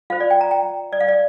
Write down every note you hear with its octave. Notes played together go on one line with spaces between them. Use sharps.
F4 C5 F5
D5
G5
A#5
G5
D5
F5
D5